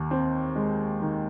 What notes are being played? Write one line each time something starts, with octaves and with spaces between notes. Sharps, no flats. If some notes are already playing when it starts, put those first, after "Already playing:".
Already playing: D#2 D#3
C4
G#3
D#3